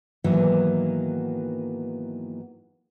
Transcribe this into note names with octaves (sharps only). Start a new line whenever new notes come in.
G#2 D#3 E3 F#3 A#3 B3